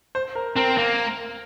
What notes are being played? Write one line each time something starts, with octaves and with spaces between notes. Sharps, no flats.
C5
A#4
C4 A#4
A#3 A#4